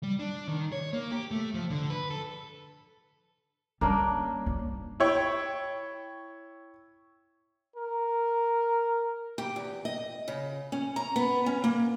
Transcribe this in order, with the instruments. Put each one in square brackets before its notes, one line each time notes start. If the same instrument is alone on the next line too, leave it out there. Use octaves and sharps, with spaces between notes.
[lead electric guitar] G3
D4
D#3
C#5
A#3
G4
A3
F3
D3
B4
A4
[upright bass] G3 [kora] A#3 C#4 D4
[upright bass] F3
[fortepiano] E4 C#5 G5
[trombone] A#4
[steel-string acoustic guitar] G4
E2
D#5
C#3
C#4
A#5
B3
C#4
A#3